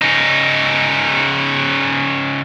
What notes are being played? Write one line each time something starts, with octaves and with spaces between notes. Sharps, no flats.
C#3 D#4